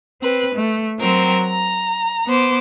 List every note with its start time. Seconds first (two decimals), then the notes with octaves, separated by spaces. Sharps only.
0.22 C4 B4
0.54 A3
1.00 F#3 C4 A#4 C5
1.44 A#5
2.28 B3 C5 D6